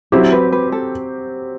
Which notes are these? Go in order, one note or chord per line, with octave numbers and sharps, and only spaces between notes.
F#3 C4 E4 G4
B4
B4
A4